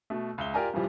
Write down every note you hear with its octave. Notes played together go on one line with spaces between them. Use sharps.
B2 A3
C#2 E5 G7
F4 G4 A#4 D5 G#5 A#5
G2 C#3 E3 F3 G3